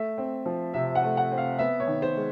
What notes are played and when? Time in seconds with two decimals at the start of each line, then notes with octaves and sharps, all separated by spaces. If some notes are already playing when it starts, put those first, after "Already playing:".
Already playing: A3 E5
0.18 C4
0.46 F3
0.74 C3 E5
0.95 F#5
1.03 A3
1.17 F#5
1.31 C4
1.38 F5
1.59 B3 E5
1.80 C#5
1.87 D#3
2.02 C5
2.16 G#3